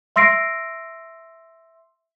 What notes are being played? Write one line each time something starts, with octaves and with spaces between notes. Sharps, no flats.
E5 C6 E6 A#6 C7 D7